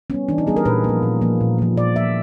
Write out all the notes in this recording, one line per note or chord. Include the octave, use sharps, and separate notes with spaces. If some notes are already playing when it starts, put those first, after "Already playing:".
G3 B3 C#4
E3 D4
D#4
G3 B3 G#4
A#4
A#2 B4
F3 A#3
A#2
F3 A#3
A#2
F3 A#3
A#2 D5
F3 A#3 E5